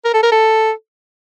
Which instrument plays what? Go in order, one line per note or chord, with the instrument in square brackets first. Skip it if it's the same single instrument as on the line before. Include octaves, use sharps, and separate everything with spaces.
[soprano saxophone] A#4
A4
A#4
A4